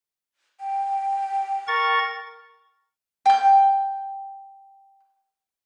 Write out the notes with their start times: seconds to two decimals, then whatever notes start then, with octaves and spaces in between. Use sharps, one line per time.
0.60 G5
1.68 A#4 C#6 A6
3.26 G5 G6